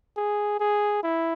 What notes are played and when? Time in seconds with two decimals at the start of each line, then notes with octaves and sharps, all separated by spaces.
0.17 G#4
0.60 G#4
1.03 E4